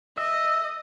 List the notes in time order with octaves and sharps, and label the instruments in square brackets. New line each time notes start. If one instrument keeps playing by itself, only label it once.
[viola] D#5 [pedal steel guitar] E5